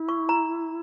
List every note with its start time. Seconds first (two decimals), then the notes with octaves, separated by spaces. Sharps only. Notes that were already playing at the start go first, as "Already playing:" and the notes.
Already playing: E4
0.09 C#6
0.29 A#5